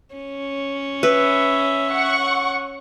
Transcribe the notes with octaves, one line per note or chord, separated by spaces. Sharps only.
C#4
B4 E5
F#5 C#6